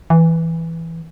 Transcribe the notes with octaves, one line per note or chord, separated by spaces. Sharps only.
E3